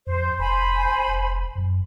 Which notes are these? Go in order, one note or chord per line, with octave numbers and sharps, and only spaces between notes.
F2 C5
F1 C5 G#5 B5
F1
F#2